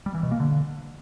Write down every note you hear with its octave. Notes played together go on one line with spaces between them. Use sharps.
G3
E3
B2
A#3
D3